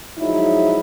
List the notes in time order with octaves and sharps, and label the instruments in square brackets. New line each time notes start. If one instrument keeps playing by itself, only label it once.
[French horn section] F3 F#3 G#3 D#4 E4